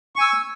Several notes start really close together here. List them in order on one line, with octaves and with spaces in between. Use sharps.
C#6 G#5 E6